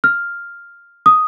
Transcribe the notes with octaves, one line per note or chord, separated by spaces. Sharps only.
F6
D#6